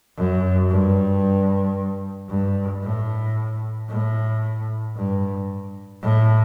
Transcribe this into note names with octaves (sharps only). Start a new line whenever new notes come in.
F#2
G2
G2
A2
A2
G2
A2